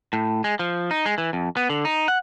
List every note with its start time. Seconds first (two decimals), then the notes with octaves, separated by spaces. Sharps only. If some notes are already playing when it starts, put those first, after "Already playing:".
0.13 A2
0.44 G#3
0.59 F3
0.91 D#4
1.06 G#3
1.18 E3
1.33 F2
1.57 B3
1.70 D3
1.85 D#4
2.08 F#5